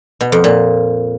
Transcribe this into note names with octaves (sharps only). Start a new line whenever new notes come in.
B2
F2
A#2